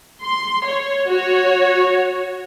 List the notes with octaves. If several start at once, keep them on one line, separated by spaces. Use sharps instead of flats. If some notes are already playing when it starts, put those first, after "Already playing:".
C6
C#5
F#4 C#5